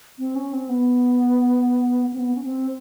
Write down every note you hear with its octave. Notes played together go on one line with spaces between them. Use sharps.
C4
C#4
C4
B3
C4
B3
C#4
C4